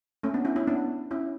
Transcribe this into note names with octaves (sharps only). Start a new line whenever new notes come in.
A3 C#4
B3 D4
C#4 E4
C#4 E4
B3 D4
C#4 E4